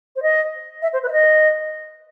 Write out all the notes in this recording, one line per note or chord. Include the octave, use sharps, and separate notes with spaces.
C5
D#5
E5
C5
B4
E5
D#5